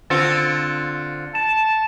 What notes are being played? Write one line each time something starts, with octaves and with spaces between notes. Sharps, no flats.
D3 C4 F4 A6 C#7
A5 E7